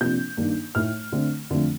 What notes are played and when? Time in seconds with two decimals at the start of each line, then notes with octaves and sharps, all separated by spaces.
0.01 C3 F3 A#3 D4 G6
0.37 G2 D#3 A#3 D4
0.75 A2 A3 D#4 F6
1.12 D3 A3 C4
1.50 F2 D3 F3 A3